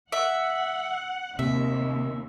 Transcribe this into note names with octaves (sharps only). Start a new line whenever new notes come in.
E5 F#5
D#2 C3 E5